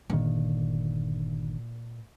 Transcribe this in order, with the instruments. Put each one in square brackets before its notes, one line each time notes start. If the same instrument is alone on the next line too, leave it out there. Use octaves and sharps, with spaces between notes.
[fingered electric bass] G1 D3 D#3 [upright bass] A#2